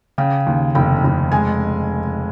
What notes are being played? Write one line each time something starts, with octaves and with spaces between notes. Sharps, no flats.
C#3 G5
D#2
F1 G5
F1
G#3 G#5